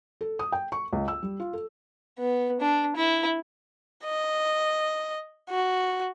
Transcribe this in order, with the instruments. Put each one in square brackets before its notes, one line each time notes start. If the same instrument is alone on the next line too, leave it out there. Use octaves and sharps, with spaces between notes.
[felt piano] A4
D#6
G5
C#6
C#2
E6
G3
F4
A4
[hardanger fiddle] B3
D4
E4
[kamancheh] D#5
F#4